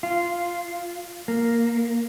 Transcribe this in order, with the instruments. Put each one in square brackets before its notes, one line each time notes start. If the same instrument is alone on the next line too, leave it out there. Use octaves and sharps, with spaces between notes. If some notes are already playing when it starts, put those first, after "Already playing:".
[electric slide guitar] F4
A#3